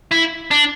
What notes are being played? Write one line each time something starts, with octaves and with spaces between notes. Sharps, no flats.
E4
D4